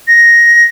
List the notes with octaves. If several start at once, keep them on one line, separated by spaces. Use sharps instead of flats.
A#6